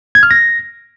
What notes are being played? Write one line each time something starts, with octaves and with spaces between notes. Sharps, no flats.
G#6
F6
A#6